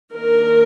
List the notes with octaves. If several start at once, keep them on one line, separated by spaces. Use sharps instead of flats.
D#3 A#3 D4 A#4